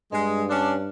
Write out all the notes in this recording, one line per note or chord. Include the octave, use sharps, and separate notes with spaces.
G2 G#3
C#4 D4